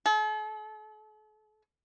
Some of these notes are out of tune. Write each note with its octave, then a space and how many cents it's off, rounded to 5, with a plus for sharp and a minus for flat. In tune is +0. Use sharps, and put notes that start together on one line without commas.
A4 -45